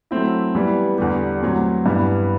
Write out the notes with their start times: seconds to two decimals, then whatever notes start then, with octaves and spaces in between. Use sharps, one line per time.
0.11 F#3 A3 C4 E4
0.55 E3 G3 B3
0.98 E2 D3 G3
1.42 A2 F#3 C4
1.86 G2 E3 B3